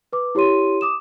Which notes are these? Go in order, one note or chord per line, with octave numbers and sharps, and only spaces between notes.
B4 D6
E4 G4 C#5 C6 D#7
D6 D#6 E7